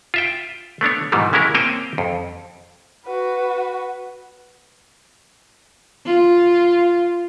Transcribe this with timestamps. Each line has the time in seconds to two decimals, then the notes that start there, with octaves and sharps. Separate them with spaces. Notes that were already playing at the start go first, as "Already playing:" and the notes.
0.14 F4 E5 G5
0.81 A3 B3 D4 C#5
1.12 G#2 B2 D#3 E3 G3 A3
1.33 C#3 G#3 C#4 E4 A#4
1.55 A#3 C4 C5 C#5 G5 G#5
1.98 F2
3.05 F#4 B4
6.06 F4